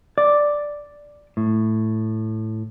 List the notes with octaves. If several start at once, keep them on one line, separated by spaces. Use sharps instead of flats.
D5
A2